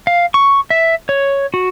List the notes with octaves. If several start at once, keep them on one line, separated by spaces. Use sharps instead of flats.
F5
C#6
E5
C#5
F#4